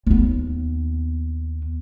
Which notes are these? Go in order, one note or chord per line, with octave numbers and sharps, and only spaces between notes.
D#2 B3